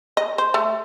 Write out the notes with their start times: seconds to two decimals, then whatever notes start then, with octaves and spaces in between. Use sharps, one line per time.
0.17 D#5
0.38 C5
0.54 A3